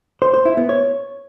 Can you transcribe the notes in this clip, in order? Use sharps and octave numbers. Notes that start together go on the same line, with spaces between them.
C5
C5
E4
B3
C#5